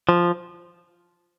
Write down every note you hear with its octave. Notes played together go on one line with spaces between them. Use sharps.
F3